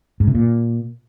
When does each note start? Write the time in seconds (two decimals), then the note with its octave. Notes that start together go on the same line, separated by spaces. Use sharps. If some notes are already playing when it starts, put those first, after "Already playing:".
0.20 G#2
0.27 C3
0.35 A#2